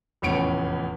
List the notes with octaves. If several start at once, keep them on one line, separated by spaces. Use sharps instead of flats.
F1 E2 A2 C#4 C#7 D7